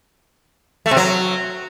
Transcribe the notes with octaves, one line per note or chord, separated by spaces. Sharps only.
A3
C3
F#3